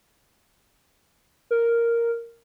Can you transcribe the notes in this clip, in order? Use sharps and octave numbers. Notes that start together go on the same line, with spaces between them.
A#4